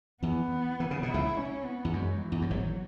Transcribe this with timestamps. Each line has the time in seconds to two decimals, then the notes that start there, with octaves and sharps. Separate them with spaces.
0.23 E2 E3 B3
0.80 E3
0.91 C#3
1.03 B2 E4
1.14 C#2 C#3
1.37 C#4
1.65 B3
1.85 E2
1.93 F#2 G#3
2.21 E3
2.32 E2
2.42 F#2
2.50 G#1 G#2 F#3